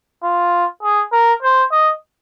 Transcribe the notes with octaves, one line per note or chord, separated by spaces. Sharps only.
F4
G#4
A#4
C5
D#5